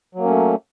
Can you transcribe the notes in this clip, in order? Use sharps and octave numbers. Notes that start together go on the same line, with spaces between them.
F#3 A3 A#3 C#4